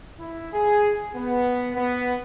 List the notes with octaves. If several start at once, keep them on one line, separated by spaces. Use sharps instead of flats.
E4
G#4
B3
B3